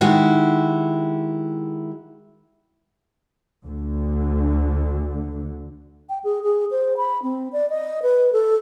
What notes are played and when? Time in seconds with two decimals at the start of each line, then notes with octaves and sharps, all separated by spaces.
0.01 D#3 G#3 E4 F#4 G4
3.65 D2 D3
6.09 G5
6.24 G#4
6.43 G#4
6.71 C5
6.97 B5
7.23 C4
7.53 D5
7.70 D#5
8.03 B4
8.33 A4